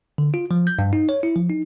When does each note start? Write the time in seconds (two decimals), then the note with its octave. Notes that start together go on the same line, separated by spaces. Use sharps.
0.18 D3
0.34 F4
0.51 F3
0.67 G6
0.79 G2
0.93 D#4
1.09 C#5
1.23 E4
1.36 F3
1.50 D#4